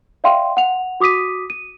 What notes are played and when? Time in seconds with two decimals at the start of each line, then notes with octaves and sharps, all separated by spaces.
0.24 D5 E5 F5 G5 C6
0.57 F#5 F7
1.00 F#4 D6 D#6 B6 D#7
1.50 D#7